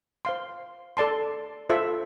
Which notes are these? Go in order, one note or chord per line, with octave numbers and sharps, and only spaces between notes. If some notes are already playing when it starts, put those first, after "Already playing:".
C5 F5 C6
A4 D5 A5 C6
F4 A4 C5 E5